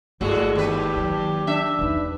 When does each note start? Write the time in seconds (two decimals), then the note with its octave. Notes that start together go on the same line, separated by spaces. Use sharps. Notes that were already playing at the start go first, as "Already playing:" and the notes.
0.21 G1 A2 G#3 F#4 A4
0.55 D#2 G4 B4
0.97 F#3
1.47 D4 E5
1.79 E2 D#4 B4